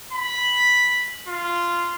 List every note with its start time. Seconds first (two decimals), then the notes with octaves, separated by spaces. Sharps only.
0.13 B5
1.28 F4